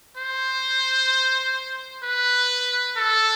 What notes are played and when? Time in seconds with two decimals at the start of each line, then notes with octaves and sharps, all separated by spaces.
0.17 C5
2.03 B4
2.97 A4